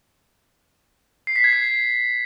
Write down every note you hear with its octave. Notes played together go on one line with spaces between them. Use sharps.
C7
B6
G#6
C7